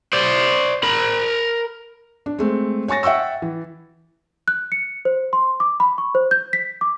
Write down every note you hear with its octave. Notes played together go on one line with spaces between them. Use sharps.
C5 D5
A#4 B5
D4
G#3 A3 C4
C#5 G#5 C#6 A6 A#6
E5 F#5 G5 C#6 E6
E3
F#6
C#7
C5
C6
D6
B5
C#6
C5
G6
B6
D6